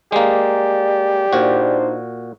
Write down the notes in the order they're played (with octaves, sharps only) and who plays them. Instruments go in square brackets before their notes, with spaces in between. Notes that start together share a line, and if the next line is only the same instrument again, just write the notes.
[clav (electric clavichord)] G#3 A#3 [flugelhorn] G4 [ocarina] D5
[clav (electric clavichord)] A#2 F#4 [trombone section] D4 D#4 C5